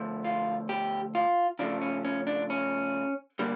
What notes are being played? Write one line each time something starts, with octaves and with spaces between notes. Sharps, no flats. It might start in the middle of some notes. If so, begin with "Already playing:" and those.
Already playing: D3 F3 A3
F4
G4
F4
C#3 F3 A3 D4
C#4
C#4
D4
C#4
D3 G3 A#3